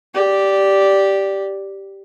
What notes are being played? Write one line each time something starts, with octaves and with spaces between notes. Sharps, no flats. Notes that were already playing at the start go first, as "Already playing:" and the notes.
G4 D5